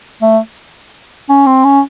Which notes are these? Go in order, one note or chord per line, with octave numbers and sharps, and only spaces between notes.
A3
C#4
C4
C#4